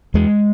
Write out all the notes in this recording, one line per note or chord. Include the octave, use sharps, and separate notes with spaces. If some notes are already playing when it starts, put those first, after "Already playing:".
E2 G#3